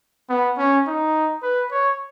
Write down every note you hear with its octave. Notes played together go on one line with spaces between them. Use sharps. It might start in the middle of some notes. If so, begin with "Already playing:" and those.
B3
C#4
D#4
B4
C#5